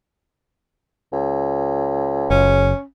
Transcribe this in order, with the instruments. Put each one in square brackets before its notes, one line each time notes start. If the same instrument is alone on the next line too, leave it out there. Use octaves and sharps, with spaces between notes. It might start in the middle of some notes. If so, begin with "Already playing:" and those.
[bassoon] C#2
[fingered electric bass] F#1 [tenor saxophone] C#4